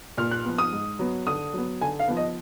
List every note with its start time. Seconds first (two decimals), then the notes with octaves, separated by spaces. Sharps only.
0.17 A#2 F6
0.31 F#6
0.45 F3 B3
0.58 D#6
0.72 G#2
0.99 F#3 B3
1.27 D3 D#6
1.54 F#3 B3
1.81 D3 G#5
1.99 F5
2.08 F3 B3
2.17 D#5